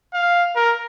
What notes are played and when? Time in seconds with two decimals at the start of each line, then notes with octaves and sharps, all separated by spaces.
0.14 F5
0.56 A#4